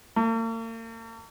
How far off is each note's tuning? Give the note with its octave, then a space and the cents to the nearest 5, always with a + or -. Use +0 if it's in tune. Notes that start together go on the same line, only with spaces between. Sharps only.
A#3 -45